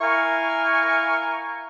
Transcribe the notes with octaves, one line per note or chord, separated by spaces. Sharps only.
E4 A#4 F5 G#5 C#6